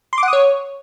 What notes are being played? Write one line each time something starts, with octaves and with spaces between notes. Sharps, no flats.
C6
D6
F#5
D#6
C#5